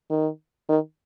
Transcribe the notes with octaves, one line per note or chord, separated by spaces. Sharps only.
D#3
D#3